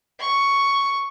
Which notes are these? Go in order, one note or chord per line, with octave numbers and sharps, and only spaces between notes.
C#6